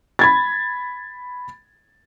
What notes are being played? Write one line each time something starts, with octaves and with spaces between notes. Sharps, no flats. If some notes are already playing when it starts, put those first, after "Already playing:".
B5 G#6 A6